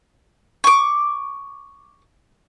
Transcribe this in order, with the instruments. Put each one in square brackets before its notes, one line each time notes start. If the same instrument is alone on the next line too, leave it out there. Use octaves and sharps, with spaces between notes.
[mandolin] C#6 D6